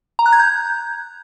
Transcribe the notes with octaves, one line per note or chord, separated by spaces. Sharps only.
A#5
F#6
G#6
G6